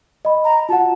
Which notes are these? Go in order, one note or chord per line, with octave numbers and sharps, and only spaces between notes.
D#5 B5
A#5
F4 F#4 F#5 A5